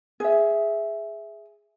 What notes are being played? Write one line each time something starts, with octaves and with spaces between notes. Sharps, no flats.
G#4 E5